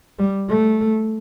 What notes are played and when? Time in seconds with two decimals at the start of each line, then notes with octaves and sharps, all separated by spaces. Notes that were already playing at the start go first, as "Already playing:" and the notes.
0.19 G3
0.49 A3